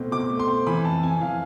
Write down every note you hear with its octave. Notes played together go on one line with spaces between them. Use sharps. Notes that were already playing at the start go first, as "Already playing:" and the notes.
Already playing: B2 A3 C4
B2 D6
A3
C6
C4
E3 B5
F2 A5
F2 G#5
E3 F5